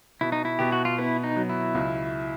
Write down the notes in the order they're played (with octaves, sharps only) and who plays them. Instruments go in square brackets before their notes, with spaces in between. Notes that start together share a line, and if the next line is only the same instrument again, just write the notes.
[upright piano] B2 [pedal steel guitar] E4
[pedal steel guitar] D#4
E4
[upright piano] B2 [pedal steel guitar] G4
[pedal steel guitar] F#4
F4
[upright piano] B3 [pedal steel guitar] E4
[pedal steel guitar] D#4
[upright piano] F#3
[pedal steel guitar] E4
[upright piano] C#2